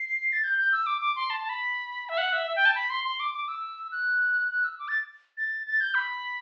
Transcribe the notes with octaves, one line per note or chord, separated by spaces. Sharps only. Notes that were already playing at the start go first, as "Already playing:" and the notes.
Already playing: C7
A6
G6
G6
E6
D6
D6
C6
A5
A5
B5
E5
F#5
E5
E5
G5
A5
B5
C6
C6
D6
D6
E6
F#6
F#6
E6
D6
A6
A6
A6
G6
B5